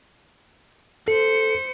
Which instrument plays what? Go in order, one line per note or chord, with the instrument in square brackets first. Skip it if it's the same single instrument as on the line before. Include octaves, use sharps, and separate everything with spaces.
[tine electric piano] A4 [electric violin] C5 C#7